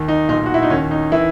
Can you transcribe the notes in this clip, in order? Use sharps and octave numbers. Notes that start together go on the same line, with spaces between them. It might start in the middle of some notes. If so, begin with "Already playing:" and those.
Already playing: D#2 D#3
D#4
B1 A#2 D#4
F#4
E4
D#4
D#2 D#3 C#4
D#4
D#3 E3 E4